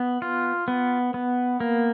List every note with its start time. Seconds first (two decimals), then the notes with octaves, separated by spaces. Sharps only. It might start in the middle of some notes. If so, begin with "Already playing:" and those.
Already playing: B3
0.22 F4
0.68 B3
1.14 B3
1.60 A#3